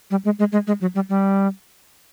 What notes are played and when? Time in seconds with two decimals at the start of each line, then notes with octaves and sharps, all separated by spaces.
0.11 G3
0.25 G#3
0.39 G#3
0.52 G#3
0.67 G#3
0.81 F#3
0.95 G3
1.09 G3